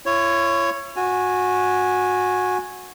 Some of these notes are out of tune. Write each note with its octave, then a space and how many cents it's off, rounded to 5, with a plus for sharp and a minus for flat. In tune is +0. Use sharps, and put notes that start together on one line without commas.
E4 +45 C#5 +0
F#4 -20 G#5 +0